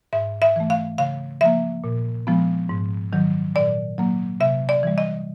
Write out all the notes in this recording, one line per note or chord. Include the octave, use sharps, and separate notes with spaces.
G#2 E5
E5
E3 A3
F5
C#3 F5
F3 A#3 E5
A#2
F3 G#3 B3
G#2
D#3 F#3
A#2 D5
F#3 A#3
C3 E5
D5
E3 G3
D#5